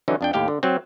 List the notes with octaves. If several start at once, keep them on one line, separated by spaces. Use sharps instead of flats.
D3 E3 F#3 C#4 D#4
F2 D4 G5
D#2 A2 G4 F5 G5
D3
F#3 C4